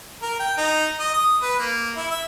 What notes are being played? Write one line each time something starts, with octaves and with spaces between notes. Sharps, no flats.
A#4
G5
D#4
D#5
D#6
B4
A#3
E4
E5